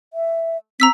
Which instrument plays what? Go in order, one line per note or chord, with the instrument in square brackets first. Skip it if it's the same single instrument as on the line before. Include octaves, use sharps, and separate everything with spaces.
[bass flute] E5
[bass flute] C4 [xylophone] A#5 E6 B6